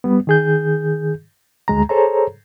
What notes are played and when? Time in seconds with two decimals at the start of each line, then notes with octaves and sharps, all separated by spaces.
0.04 G3 B3
0.27 D#3 G#4 G6
1.68 D2 G#3 A#5
1.89 G#4 A4 C5 C#5 A#5